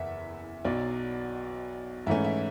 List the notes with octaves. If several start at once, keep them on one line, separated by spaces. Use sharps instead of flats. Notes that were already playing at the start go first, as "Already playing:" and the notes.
Already playing: F#1 E2 E5 F#5
B1 B2 F#3 D5
G#2 E3 A3 C#4 E5
E5